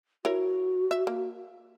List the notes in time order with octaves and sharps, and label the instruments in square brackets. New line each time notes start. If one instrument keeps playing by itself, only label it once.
[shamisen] E4 A#4 C#5 [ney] F#4
[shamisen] E5
A#3